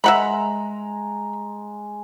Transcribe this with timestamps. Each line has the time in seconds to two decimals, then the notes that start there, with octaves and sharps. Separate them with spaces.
0.04 G#3 E5 F#5 A#5 B5